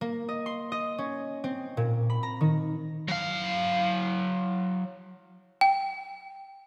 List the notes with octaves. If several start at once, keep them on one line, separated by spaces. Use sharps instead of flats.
A#3
D#5
C6
D#5
C#4
C4
A#2
B5
A#5
D#3
F#3 F5
G5